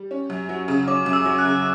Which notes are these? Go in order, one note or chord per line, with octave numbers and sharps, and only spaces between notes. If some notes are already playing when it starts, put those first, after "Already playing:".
Already playing: G3
C#4
F#2
F#3
C#3
C#4 D6
F#2
E6
F#3
F#6
C#3